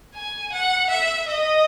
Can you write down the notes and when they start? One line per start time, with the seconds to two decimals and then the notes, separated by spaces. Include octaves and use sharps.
0.15 G#5
0.52 F#5
0.90 E5
1.28 D#5